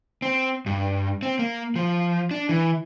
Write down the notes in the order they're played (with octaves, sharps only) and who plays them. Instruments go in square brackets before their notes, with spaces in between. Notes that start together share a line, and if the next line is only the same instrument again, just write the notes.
[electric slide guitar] C4
G2
C4
A#3
F3
D4
E3